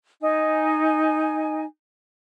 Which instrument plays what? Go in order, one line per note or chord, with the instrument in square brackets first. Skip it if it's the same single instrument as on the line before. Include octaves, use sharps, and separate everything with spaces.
[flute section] D#4 G#5